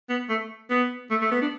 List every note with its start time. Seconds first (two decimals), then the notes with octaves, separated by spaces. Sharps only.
0.09 B3
0.29 A3
0.70 B3
1.11 A3
1.21 A3
1.31 B3
1.41 D4